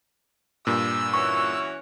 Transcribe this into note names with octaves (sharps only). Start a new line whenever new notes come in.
G2 A#2 E6
E3 C#4 F#4 C#6